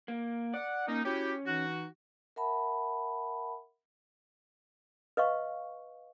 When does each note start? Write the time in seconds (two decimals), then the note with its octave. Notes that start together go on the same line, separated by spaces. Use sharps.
0.08 A#3
0.54 D5 F#5
0.88 A#3 C#4 D#4
1.05 C#4 E4 F#4 G4
1.46 E3 D#4 F#4
2.36 A#4 E5 F#5 A5 B5
5.17 B4 D#5 F5 C#6